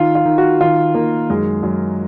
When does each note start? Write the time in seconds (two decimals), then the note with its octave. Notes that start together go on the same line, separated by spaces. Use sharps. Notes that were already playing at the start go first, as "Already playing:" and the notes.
Already playing: D#3 F4
0.15 F4
0.25 D#3
0.38 F#4
0.60 D#3 F4
0.95 D#3 A#3
1.30 F#2 G#3
1.63 F#2